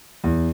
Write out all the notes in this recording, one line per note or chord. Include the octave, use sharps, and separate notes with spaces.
E2